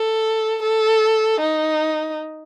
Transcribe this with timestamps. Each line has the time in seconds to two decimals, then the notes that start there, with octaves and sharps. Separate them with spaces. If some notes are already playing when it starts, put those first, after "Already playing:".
Already playing: A4
0.62 A4
1.41 D#4